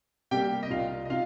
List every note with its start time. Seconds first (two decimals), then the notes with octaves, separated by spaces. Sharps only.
0.31 C3 G3 A#3 G4 G5
0.63 D#5
0.70 C2 F4 F5
1.05 D#5
1.10 C3 F4 F5